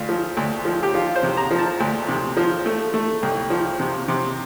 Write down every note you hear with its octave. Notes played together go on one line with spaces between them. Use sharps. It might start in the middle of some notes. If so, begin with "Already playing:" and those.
Already playing: D2 F4
F3
D2
F3
G4
F3 F4
C5
C3
A#5
F3
A5
D2
C3
F3
A3
A3
C2
F3
C3
C3